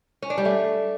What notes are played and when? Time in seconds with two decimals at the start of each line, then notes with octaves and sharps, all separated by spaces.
0.22 C#4
0.30 D4
0.38 G3
0.45 A3